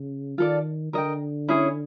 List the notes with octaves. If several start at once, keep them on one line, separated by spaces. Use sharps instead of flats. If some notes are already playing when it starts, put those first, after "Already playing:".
Already playing: C#3
D#3 F4 A4 D5
D3 A#4 D#5 G5
C#4 E4 G#4 C#5